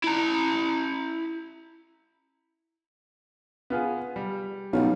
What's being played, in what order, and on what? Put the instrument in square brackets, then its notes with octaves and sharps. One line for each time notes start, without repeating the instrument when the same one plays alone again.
[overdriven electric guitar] E4 A#5
[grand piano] B3 F4 G#4
G3
[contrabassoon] B1 [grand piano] G3 C#4 F4